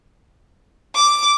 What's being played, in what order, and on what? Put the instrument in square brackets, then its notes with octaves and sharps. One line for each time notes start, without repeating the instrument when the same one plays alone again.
[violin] D6